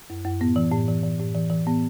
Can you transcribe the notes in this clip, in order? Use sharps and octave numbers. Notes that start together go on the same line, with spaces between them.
F#2
F#2
A2 B3
E3
A2
E3
E3
A2
E3
E3
A2 B3